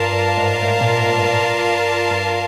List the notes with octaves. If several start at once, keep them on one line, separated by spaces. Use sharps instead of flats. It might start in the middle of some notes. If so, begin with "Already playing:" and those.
Already playing: G2 F4 A#4 D5 F5 A5
G2
G#2
A2
A#2
G#2
G2
G2